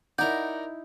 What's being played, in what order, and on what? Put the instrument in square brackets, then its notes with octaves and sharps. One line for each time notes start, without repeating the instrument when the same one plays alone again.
[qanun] D#4 E4 [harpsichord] A#4 D5 [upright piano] F#5 A#5 [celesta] G6